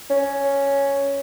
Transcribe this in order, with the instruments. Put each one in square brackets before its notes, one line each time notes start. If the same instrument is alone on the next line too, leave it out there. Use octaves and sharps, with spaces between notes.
[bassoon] C#4